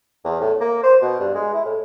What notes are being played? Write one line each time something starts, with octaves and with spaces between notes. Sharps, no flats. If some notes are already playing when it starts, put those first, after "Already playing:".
E2
A2
A#3
C5
B2
G2
G#3
E4
A2